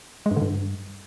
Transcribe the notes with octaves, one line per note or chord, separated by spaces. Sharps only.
G#3
G2
D3
G2